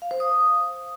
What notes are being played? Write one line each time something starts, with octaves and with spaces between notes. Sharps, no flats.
F5
C5
D#6